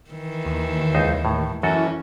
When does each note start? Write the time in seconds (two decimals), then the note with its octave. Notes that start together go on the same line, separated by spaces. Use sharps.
0.10 D#3 E3
0.45 D#2
0.95 C#2 D#4 C5
1.25 A2
1.63 F#2 E3 C#4 F#4 A4